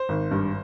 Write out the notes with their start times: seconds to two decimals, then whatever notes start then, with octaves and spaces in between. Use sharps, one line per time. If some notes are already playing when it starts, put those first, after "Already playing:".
Already playing: C5
0.09 G#1
0.31 G2